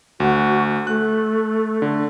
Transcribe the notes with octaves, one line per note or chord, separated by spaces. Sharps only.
D2 F#4
A3 F#6
D3